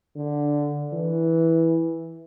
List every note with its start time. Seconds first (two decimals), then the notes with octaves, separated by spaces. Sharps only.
0.16 D3
0.93 E3